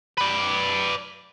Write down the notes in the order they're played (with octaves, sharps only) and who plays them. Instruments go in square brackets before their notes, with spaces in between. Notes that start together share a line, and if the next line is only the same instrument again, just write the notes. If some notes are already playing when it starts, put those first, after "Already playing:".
[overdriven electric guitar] B4 D5